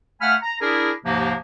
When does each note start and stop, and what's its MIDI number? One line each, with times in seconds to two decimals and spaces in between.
0.21 0.34 57
0.21 0.34 77
0.21 0.34 78
0.21 0.34 80
0.21 0.34 83
0.21 0.34 89
0.42 0.56 82
0.61 0.91 62
0.61 0.91 64
0.61 0.91 68
0.61 0.91 70
1.05 1.34 39
1.05 1.34 44
1.05 1.34 48
1.05 1.34 53
1.05 1.34 58